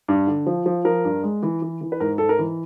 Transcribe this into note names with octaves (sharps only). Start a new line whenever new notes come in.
G2
D3
F3
F3
F3 A#4
G2
G#3
E3
E3
E3
B4
G#2 A#4
G#2 A4
A#4
E3